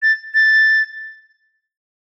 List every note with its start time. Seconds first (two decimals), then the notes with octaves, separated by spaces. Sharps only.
0.02 A6
0.34 A6